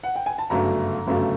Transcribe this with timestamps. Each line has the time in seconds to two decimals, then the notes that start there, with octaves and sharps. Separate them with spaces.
0.03 F#5
0.16 G5
0.26 G#5
0.38 A5
0.50 G1 F#2 C#3 F#3 A3 A#5
1.07 G1 F#2 C#3 F#3 A3